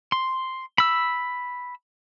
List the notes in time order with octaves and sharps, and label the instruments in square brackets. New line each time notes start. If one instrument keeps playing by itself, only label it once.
[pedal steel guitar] C6
B5 E6